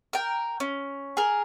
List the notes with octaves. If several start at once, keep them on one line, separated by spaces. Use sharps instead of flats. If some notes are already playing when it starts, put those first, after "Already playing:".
A#4 G5
C#4
G#4 A#4